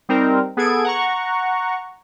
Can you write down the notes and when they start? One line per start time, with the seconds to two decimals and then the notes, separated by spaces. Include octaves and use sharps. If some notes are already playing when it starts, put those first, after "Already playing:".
0.09 G3 C4 D#4 A#4
0.57 B3 G#4 A4 G#6 D7
0.84 F#5 A#5 C#6